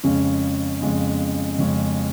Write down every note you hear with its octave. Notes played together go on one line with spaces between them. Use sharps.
F2 C#3 G#3 C#4
F2 C#3 G#3 C#4
F2 C#3 G#3 C#4